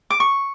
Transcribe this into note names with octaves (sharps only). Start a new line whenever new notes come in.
D6
C#6